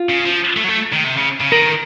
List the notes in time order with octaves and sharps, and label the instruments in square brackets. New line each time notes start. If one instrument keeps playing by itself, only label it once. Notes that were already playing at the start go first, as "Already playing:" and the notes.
Already playing: [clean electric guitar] F4
[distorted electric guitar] C#3
F3
A3
F#3
A3
D#3
C3
C#3
C#3
[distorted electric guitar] D#3 [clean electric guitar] A#4